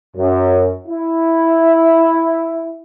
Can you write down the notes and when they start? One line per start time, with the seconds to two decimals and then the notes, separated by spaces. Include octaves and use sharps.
0.17 F#2
0.88 E4